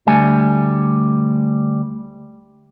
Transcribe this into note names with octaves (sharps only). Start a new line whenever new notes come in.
D2 G3 A3 G#5